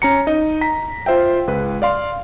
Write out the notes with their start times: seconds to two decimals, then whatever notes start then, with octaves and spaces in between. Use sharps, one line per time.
0.02 C#4 A#5 C#7
0.27 D#4 D#5
0.61 A#5 B6
1.06 F4 C5 E5 G5
1.47 C#2 B4
1.82 D5 F5 C6